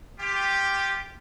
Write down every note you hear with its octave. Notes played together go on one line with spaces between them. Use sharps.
F4 G4